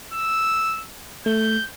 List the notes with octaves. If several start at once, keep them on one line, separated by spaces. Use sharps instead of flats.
E6
A3 G6